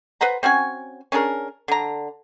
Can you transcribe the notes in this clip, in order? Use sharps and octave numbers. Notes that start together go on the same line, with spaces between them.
B4 C5 F#5 A#5
C4 C#4 F#4 G#5
C#4 D4 G#4 A#4
D3 A#5